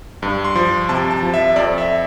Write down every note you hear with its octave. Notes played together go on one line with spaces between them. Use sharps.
G2
C6
F3
C3 A5
A5
F3
E5
F2 D5
E5